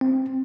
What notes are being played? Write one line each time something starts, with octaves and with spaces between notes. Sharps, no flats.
C4